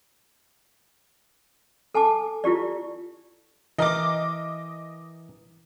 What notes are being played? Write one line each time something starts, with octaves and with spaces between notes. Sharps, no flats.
A4 G#5 A5 D6
E4 F4 G4 D5
E3 A#4 D#5 D6